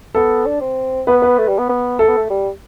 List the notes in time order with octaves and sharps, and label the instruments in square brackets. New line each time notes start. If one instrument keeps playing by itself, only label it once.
[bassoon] B3 [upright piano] A4
[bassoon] D4
C4
[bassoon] B3 [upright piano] B4
[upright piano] B4
[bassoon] A3
G3
B3
B3
[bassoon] A3 [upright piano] A4
[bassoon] B3
A3
G3